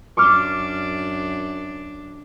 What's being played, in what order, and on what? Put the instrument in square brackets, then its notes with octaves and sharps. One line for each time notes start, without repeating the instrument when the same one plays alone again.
[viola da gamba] F#2 D4 [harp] C#6 D6 F6